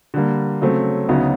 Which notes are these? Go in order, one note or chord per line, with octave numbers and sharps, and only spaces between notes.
D3 G3 A#3
C#3 F#3 A3 C4
D2 C#3 F#3 B3 D#4